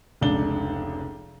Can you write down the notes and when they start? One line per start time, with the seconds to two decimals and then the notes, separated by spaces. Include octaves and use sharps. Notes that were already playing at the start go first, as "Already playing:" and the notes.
0.21 F1 C#2 D4 G7